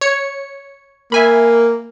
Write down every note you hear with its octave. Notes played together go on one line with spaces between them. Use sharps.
C#5 C#7
A#3 E5 G#5 B5